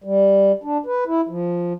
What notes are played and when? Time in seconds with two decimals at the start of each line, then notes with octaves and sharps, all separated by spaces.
0.04 G3
0.64 D4
0.86 B4
1.07 E4
1.29 F3